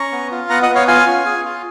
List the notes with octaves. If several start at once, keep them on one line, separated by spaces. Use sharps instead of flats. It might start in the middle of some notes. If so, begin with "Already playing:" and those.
Already playing: C#4 A#5 C#6
B3
F4
B3 F#5 A#5
D#5 F#5
B3
C#5 F5
F4 F5 G#5
C#4
G#4
F4